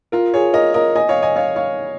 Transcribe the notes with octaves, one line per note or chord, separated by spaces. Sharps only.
F4 A#4
G#4 C#5
A#4 D#5
A#4 D#5
D#5 G#5
C#5 F5
D#5 G#5
C#5 F5
C#5 F5